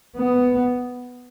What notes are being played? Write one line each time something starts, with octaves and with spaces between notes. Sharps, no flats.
B3